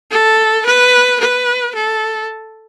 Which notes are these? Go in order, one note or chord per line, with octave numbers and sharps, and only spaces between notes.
A4
B4
B4
A4